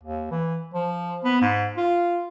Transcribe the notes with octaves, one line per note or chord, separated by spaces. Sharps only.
D#2
E3
F3
B3
G#2
F4